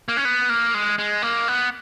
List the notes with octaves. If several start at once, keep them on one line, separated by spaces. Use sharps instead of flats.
A#3
C#4
B3
A#3
G#3
G#3
A#3
B3